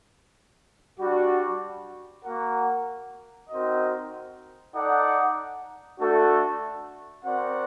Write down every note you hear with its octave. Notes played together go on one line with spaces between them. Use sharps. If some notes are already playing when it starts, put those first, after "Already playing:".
G3 D4 F#4
A#3 F#4 A#4 F#5
C4 D#4 F#4 A#4 D#5
D#4 A4 D5 F#5
A3 D4 F#4 A4
C4 F#4 A#4 D5 F#5